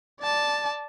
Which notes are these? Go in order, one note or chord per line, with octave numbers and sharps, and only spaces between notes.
D5 A5